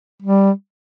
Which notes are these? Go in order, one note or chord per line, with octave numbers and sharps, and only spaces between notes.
G3